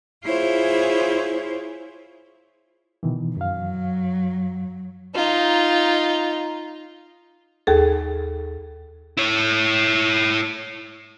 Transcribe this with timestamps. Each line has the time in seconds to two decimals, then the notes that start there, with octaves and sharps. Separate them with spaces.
0.25 E4 F4 G#4 C5 C#5
3.03 B2 D#3 E3
3.37 F#2 F#3 F5
5.15 D#4 F4
7.67 D#2 G#4 A4
9.17 E4 C#5